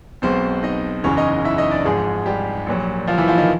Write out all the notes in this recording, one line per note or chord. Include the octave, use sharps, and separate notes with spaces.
B1 B2 G#3 C4 C5
D#4 D#5
F#1 E2 C#3 F#3 C#4 C#5
D#4 D#5
E4 E5
D#4 D#5
D4 D5
G#1 G#2 F3 G#3 G#4
G3 G4
A#1 A#2 F#3
F3 F4
E3 E4
F3 F4
D#3 D#4